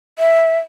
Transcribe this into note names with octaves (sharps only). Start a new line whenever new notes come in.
E5